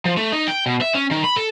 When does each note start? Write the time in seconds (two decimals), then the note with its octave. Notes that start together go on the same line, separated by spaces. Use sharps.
0.05 F3
0.17 A3
0.32 D#4
0.48 G5
0.66 B2
0.81 E5
0.94 C#4
1.11 D#3
1.24 B5
1.36 A4